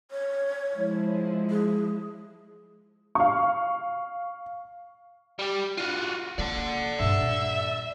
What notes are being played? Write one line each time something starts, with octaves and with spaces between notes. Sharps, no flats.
C#5
F3 G#3 E4
G#4
F5 C#6
G3 G4
F4 F#4
A#3 D5 F#5
G2 A#2 E5